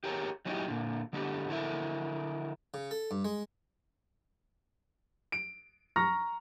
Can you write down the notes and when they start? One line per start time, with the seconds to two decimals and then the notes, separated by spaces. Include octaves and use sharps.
0.04 G4 G#4 A#4 C#5 G5
0.45 F#3 G#3 C#4 D#4 E4 G4
0.68 A#2 D3
1.13 D3 G#3 D4 G4 A4
1.49 D3 E4 A4 A#4 E5
2.74 C#3
2.91 A4
3.11 G2
3.25 G#3
5.32 D7
5.96 A#5 C#6 F6 A#6